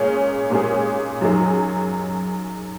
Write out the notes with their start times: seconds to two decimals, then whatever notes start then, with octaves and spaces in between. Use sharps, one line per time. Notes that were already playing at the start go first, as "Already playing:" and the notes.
Already playing: A#2 G#3 C#4 G#4
0.50 A#2 G#3 C#4 G#4
1.21 F#2 F#3 D#4 G#4